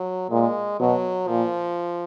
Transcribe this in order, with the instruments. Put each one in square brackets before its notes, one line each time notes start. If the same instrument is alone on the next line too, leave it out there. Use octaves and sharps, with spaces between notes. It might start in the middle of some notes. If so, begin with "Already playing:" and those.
Already playing: [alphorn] F#3
[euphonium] A#2 [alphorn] G#3
[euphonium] B2 [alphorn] F#3
[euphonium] A#2 [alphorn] F3